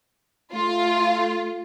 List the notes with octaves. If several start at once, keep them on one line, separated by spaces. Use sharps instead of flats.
A3 F4